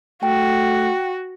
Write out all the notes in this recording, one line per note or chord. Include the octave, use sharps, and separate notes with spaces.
A3 F#4 G5